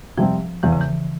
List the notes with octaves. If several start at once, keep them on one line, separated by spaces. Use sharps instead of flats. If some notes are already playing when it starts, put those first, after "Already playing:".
C3 F3 G3 C4
E2 E3
C#3
E3